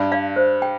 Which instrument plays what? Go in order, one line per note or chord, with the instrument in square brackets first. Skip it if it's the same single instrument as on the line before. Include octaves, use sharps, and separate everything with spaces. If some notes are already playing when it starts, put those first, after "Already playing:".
Already playing: [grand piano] G2
[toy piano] D5 F5
C5
G5